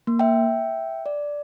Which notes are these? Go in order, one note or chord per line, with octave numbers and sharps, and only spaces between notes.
A#3
E5 G5
D5